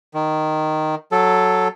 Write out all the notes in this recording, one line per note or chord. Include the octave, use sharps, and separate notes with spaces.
D#3
F#3 A4